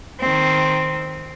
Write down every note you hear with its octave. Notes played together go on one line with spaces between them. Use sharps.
D#3 C4